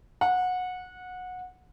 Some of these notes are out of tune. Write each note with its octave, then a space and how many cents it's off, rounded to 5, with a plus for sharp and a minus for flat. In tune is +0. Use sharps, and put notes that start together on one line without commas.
F#5 -20